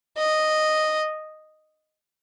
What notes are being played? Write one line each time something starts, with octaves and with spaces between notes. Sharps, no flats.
D#5